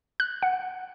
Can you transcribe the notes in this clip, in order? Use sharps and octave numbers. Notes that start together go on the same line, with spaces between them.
F#6
F#5